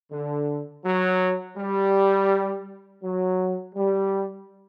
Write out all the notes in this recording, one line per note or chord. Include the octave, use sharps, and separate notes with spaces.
D3
F#3
G3
F#3
G3